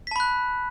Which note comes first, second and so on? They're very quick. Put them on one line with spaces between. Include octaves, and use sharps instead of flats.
B6 A5 B5 F#6